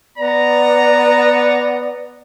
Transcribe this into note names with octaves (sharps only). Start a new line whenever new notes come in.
B3 D5 A#5